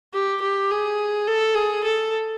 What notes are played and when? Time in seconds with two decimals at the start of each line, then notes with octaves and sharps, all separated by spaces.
0.14 G4
0.41 G4
0.71 G#4
1.27 A4
1.55 G#4
1.84 A4